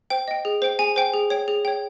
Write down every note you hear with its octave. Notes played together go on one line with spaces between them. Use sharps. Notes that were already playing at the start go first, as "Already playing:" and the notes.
C5 G5
D#5 G5
G#4
C5 G5
G#4 G#5
C5 G5
G#4
C#5 G5
G#4
C#5 G5